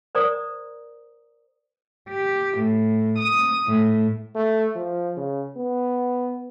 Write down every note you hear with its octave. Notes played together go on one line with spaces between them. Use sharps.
A#4 C5 D5 A#5 D#6
G4
A2
D#6
A2
A3
F3
C#3
B3